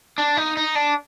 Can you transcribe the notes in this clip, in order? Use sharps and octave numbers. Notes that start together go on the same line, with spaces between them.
D4
D#4
D#4
D4